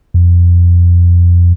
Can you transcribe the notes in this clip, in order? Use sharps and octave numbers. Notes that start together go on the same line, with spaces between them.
F2